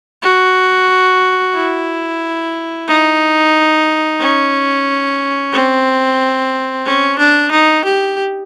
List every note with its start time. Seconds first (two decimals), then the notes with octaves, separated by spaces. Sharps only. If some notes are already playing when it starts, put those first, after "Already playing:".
0.22 F#4
1.54 E4
2.88 D#4
4.20 C#4
5.53 C4
6.85 C#4
7.19 D4
7.51 D#4
7.85 G4